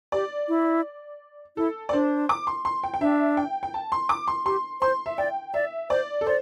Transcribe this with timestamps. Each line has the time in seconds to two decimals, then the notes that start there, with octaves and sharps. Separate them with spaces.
0.12 G4 D5
0.48 E4
1.57 E4 A4
1.89 D5
1.93 D4 C5
2.29 D6
2.47 C6
2.65 C6
2.83 G5
2.94 G5
3.01 D4 E5
3.37 G5
3.63 G5
3.74 A5
3.92 C6
4.09 D6
4.28 C6
4.46 G4 C6
4.81 C5 C6
5.06 E5
5.18 D5 G5
5.54 D5 E5
5.90 C5 D5
6.21 A4
6.26 C5 D5